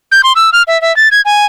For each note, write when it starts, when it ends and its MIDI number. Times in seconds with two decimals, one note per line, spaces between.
0.12 0.21 91
0.24 0.33 84
0.36 0.50 88
0.53 0.63 89
0.67 0.80 76
0.82 0.95 76
0.97 1.08 93
1.12 1.21 92
1.25 1.46 80